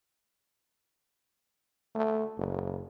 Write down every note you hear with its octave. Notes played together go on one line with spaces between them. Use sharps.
A3
F#1